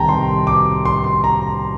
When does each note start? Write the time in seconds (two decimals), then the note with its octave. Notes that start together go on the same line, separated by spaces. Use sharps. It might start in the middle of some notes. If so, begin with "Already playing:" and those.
Already playing: C2 C3 D#3 G5 A5 A#5
0.09 C6
0.47 D6
0.85 C6
1.04 C6
1.24 A#5